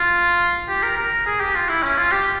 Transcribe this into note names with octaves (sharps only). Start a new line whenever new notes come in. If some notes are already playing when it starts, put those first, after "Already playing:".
Already playing: F4
G4
A#4
A#4
G#4
G4
F4
E4
C#4
F4
G4